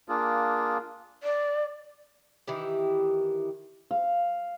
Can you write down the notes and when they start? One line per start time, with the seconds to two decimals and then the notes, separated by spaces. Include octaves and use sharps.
0.09 A#3 D4 F4 G#4
1.23 D5
2.47 D#3 E3 E4 G4
3.91 F5